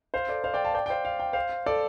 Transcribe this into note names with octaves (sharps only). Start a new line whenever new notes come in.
C5 F5
A4 D5
C5 F5
D5 G5
F5 A5
D5 G5
G5
C5 F5
F5
G5
C5 F5
A4 D5